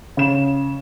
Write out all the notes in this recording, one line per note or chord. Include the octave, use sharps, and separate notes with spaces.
C#3 E7